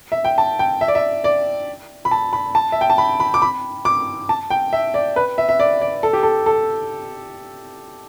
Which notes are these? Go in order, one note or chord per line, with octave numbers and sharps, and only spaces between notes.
E5
G5
A5
G5
E5
D5
E5
D5
B5
A5
B5
A5
E5
G5
A5
B5
B5
D6
B5
D6
A5
G5
E5
D5
B4
E5
E5
D5
D5
A4
G4
A4
A4